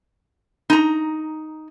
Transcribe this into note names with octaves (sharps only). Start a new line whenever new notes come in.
D#4 A#5